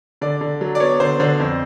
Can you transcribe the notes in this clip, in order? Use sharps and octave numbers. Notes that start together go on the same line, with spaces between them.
D3 D5
D3
F#3
D5
B3 C#5
D3 C5
D3 C5
F2